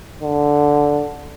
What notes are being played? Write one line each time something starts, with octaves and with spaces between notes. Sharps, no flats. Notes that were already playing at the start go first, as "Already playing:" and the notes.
D3